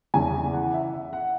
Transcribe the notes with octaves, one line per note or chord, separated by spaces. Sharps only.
E2 C#3 E3 G#5
F#5
E5
E5
F#5